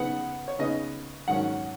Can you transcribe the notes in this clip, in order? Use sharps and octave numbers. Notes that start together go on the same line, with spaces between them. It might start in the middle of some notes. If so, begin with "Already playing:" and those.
Already playing: C#3 B3 D#4 F#5
C#5
C#3 B3 D#4 D#5
G#2 D#3 F#3 C#4 F#5